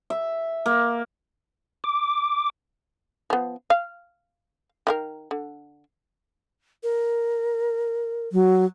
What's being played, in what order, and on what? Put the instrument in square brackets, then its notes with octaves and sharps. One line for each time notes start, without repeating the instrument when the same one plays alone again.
[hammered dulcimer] E5
A#3
[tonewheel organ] D6
[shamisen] F3 B3
F5
D#3 F4 A#4
D3
[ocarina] A#4
[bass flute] F#3